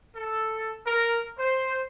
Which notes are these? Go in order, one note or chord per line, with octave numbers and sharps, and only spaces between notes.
A4
A#4
C5